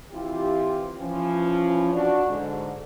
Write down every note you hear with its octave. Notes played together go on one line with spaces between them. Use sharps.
E3 C4 E4 F4 G4
E3 F3 C#4
D4 F#4
G#2 D3